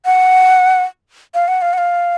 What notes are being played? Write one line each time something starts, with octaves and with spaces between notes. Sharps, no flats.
F#5
F5
F#5
F5
F#5
F5